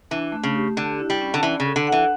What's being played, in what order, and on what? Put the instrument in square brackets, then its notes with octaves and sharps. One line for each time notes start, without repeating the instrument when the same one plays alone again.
[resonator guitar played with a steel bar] E3 [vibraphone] D4
[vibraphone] A3
[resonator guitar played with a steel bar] C#3
[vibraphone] G4
[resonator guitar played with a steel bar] D3 [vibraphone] G4
[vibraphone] E4
[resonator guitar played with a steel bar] G3
[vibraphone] C#4
[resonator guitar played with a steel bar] D3
[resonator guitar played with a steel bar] E3 [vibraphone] D5
[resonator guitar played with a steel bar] C#3
[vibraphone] A4
[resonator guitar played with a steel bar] D3
[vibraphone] F#5
[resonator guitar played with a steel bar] E3